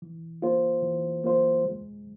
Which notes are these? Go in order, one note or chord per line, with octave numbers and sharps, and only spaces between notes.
E3
A#3 F4 C5
E3
A#3 F4 C5
G#3